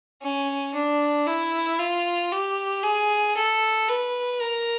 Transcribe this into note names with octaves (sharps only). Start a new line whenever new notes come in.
C#4
D4
E4
F4
G4
G#4
A4
B4
A#4